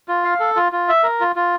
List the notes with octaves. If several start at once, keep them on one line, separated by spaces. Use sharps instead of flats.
F4
F5
A4
F4
F4
E5
A#4
F4
F4